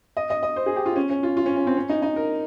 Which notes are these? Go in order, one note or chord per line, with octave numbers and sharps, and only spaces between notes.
D#5
D#5
D#5
C5
G#4
G4
F4
C#4
C#4
F4
F4
C#4
C#4
C4
C#4
D#4
D#4
A#4